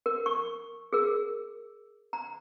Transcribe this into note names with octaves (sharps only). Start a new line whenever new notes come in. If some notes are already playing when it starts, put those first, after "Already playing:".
A#4
C#6
G#4 A#4
A#5